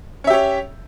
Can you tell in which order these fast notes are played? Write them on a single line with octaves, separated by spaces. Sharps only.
C#4 E5 G4 C#5